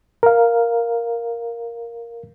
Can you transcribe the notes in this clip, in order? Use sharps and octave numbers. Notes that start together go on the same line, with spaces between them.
A#4 F5